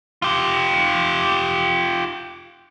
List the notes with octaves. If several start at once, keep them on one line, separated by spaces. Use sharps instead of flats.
F4 G4